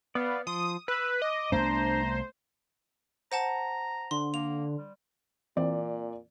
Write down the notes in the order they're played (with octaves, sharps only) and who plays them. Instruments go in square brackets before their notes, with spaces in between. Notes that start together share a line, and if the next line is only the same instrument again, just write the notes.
[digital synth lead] B3 [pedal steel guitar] D5 F5
[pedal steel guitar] F3 C6 [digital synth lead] D#6
[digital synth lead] B4 [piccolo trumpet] E6 [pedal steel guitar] F#6
[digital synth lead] D#5 [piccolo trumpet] D6
[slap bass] C2 A3 B3 [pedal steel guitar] D4 [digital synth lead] C5 [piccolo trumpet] A#5
[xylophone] C5 F#5 A5 [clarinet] A#5
[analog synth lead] D3 [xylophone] C6
[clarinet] A#3 [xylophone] F7
[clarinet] G3
[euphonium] A#2 [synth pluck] E3 C4 [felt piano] D5